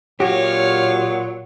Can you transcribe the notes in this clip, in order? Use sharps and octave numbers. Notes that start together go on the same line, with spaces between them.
A#2 F#3 F#4 G4 C#5 F5